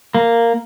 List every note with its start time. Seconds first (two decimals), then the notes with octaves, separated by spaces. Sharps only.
0.15 A#3